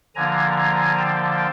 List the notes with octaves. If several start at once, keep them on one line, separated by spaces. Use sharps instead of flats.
D3 F3 A#3 D4 G#5 A#5
G#5 A#5
G5 A5